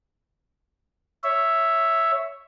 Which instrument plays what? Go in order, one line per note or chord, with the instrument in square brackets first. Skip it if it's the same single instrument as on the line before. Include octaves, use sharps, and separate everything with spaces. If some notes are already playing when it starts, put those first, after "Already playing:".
[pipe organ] C#5 E5